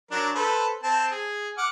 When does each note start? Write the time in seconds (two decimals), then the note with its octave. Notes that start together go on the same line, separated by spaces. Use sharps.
0.11 F#3 D4 A#4
0.35 A4 B4 C5
0.83 C4 A5
1.11 G#4
1.58 F#5 D6 F6